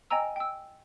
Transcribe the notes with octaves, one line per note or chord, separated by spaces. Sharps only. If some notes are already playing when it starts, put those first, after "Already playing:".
D#5 G5 G#5 A#5 E6
G5 E6